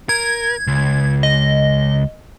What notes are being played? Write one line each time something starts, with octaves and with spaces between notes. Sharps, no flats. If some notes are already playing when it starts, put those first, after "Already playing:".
A#4 G#6
C#2
D#5